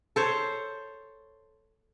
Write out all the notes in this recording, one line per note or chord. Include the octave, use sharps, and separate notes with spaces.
A4 C5 C#5